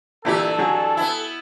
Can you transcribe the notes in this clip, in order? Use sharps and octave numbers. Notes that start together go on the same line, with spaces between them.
G2 A#2 E3 E4 G4 A4 B4
F#3 G#4
B3 E4